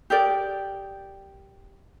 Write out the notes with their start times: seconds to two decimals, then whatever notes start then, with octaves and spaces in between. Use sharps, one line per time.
0.10 G4 G#4 A#4 D5